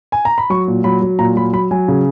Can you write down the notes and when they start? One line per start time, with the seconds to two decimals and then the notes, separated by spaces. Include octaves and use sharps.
0.12 G#5
0.25 A#5
0.38 B5
0.50 F#3 C#6
0.68 A#2
0.84 F#3 B5
1.02 F#3
1.19 A#2 A#5
1.36 F#3 B5
1.53 F#3 B5
1.71 F#3 G#5
1.88 C#3